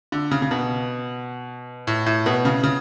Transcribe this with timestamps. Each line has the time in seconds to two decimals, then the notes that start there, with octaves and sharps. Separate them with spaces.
0.12 D3
0.31 C#3
0.42 C#3
0.51 B2
1.87 A2
2.06 A2
2.26 B2
2.45 C#3
2.63 C#3